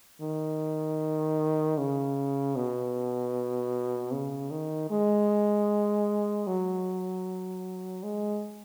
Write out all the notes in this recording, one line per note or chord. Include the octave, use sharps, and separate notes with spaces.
D#3
C#3
B2
C#3
D#3
G#3
F#3
G#3